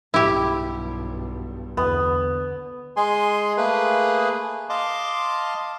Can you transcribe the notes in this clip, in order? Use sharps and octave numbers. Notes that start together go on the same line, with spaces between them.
B1 G2 E4 G4
E2 D3 B3
G#3 G#4 G#5 C6
A3 A#3 G#4 B4
D#5 F5 A5 C6 D6